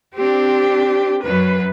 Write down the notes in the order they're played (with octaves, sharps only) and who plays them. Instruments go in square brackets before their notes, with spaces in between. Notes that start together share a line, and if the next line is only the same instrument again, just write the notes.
[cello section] C4 D4 [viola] G4
[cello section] F#2 [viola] B4